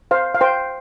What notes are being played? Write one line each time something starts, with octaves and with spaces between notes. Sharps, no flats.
C5 F5
F5
C5 G5